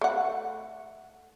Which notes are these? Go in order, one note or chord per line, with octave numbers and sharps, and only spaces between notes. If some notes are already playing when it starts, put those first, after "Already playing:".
A3 F#5